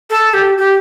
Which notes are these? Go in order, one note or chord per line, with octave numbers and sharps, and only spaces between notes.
A4
G4
G4